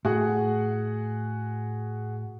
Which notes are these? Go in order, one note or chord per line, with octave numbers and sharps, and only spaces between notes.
A2 F#4 G#4 F#5